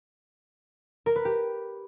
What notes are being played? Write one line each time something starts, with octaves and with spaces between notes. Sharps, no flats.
A#4
B4
G4